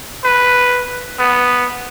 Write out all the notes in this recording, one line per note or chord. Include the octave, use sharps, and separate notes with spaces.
B4
B3